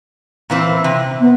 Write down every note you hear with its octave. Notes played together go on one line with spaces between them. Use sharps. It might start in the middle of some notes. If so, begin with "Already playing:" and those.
A#2 E3 C4
C3
B3